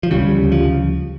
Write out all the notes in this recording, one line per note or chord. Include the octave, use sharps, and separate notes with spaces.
F3
D2 C#3 G3
F3